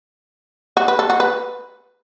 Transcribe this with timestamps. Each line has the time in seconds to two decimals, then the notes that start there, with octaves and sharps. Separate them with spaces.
0.77 F#4
0.88 B4
0.99 A4
1.10 F#4
1.20 B4